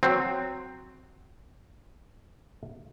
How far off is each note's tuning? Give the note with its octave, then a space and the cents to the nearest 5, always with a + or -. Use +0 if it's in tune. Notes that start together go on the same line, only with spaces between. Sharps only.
F#3 +0 C4 +0